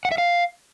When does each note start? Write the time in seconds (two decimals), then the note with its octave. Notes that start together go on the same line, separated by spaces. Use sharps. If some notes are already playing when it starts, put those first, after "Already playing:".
0.05 F#5
0.12 E5
0.18 F5